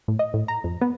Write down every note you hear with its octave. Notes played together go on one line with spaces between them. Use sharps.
A2
D#5
A2
A#5
F2
B3